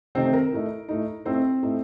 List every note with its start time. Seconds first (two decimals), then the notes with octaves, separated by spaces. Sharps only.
0.15 C3 D#3 A3 C4 D#4 C5
0.33 A#4
0.52 A2 A3 D#4
0.89 A2 A3 D#4
1.25 A2 A3 C4 D#4 C5
1.63 A2 A3 D#4